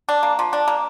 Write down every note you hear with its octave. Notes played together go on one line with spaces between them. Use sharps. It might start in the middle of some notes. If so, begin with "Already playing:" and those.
D4
A#3
F3
D4
A#3